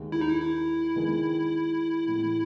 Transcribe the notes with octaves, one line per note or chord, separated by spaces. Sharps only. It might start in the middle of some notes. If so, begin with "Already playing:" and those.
Already playing: D#2 D#3 G#3
E4
D#4
E4
E4
D#3 G#3 B3
A2 E3 G#3 B3